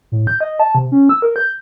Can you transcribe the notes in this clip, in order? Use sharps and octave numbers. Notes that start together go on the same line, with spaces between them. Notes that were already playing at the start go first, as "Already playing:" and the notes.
A2
G6
D#5
A5
C3
C#4
E6
A#4
G6